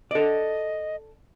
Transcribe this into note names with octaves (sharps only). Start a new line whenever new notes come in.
A4 D5 D#5